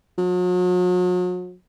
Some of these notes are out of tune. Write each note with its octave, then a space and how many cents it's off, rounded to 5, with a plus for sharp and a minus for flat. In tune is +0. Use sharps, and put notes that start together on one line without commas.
F#3 -40